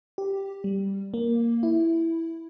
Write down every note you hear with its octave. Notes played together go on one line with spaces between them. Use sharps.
G4
G3
A#3
E4